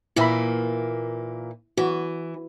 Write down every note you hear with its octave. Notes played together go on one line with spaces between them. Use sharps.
A#2 E3 A#3 E4 E5 B5
E3 F#4